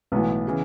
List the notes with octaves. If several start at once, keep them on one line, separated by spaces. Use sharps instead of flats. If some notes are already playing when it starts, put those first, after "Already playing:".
B1 A2 E3 B3
C#3 E3